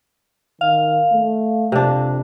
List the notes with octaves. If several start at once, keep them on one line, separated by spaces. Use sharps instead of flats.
D#3 F5
A3
F2 C3 D4